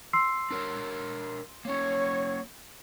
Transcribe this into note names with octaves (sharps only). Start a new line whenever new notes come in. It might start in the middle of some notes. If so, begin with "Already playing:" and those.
C6 E6 C7
D4 A#4 C#5
A#3 C#4 C#5